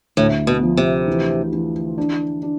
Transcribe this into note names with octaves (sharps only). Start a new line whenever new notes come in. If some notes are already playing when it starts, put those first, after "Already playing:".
D2 A2
B2
F3
C3
E3
E3
D4
D4